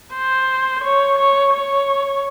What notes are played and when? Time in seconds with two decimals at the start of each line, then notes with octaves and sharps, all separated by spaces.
0.15 C5
0.84 C#5
1.19 C#5
1.54 C#5